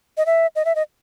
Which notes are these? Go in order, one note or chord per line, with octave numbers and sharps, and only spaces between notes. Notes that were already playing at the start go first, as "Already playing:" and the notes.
D#5
E5
D#5
E5
D#5